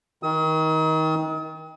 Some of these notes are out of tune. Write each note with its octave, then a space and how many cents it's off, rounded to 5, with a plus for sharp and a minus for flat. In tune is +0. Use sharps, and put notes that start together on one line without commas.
D#3 +25 D#6 +40